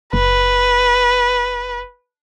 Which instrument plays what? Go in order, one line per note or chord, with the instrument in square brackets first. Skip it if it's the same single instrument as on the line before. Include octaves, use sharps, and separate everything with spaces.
[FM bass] F#1 [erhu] B4